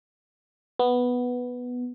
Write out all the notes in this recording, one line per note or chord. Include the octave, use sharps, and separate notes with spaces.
B3